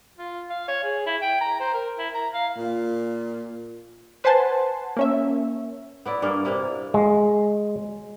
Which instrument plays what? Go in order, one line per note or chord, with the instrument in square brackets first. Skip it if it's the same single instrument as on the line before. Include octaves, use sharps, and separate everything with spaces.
[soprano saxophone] F4
F5
C#5
G#4
E4
G5
A#5
C5
A#4
E4
A#5
F5
[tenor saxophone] A#2
[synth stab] B4 C5 F#5 G#5 A5 C6
A#3 C#4 E5
[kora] B3 E4 D5
G2 A#3 A4
C3 A#3 E4
[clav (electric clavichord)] G#3